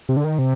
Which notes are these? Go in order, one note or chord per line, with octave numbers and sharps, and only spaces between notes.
C3
D3
D#3
C3